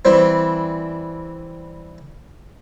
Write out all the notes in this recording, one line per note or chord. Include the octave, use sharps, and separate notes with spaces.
E3 G3 C4